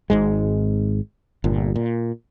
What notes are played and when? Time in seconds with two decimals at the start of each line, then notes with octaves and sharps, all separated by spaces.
0.10 G#1 G#2 G#3
1.44 G1 A#2
1.76 A#2